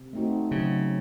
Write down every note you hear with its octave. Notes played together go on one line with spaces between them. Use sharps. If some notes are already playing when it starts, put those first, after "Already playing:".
Already playing: C3
A3 C4 D#4 F#4
C#3 F#3